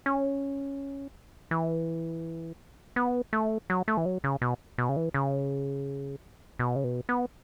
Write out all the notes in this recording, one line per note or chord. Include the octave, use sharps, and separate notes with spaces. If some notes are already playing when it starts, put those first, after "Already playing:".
C#4
E3
B3
A3
F#3
A3
E3
F#3
C#3
B2
B2
C#3
E3
C#3
B2
C#3
B2
B3